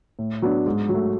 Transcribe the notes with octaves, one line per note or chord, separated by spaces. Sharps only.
A2
F#3 B3 D4
G#2
F#3
A3